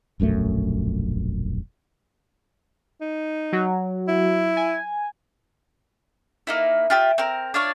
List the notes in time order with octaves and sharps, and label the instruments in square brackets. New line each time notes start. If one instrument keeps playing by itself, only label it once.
[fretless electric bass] E1 A#1 F#2 A3
[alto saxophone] D#4
[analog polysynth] F#3
[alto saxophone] E4
[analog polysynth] G#5
[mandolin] A#3 D#4 E4
F4 G4 E5
C4 A#4
D4 F4 C#5 D5